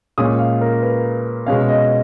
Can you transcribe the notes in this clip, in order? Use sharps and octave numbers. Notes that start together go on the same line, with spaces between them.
A#2 G#3 C#4 D#6
F5
A#4
B4
B2 G#3 C#4 F5
D#5